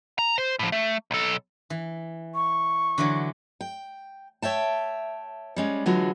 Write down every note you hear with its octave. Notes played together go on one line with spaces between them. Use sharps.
A#5
C5
A2 F3
A3
B1 A4
E3
C#6
D3 E3 F#3
G5
C#5 E5 G5 A5
G3 G#3 C#4
D3 E3 F#3 G#3 F4 F#4